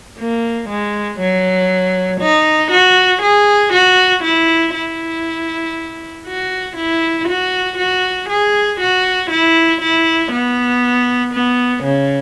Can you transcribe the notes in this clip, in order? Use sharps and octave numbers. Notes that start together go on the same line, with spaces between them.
A#3
G#3
F#3
D#4
F#4
G#4
F#4
E4
E4
F#4
E4
F#4
F#4
G#4
F#4
E4
E4
B3
B3
C#3